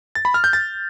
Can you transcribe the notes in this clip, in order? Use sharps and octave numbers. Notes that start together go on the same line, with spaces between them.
A6
B5
F6
G6
A6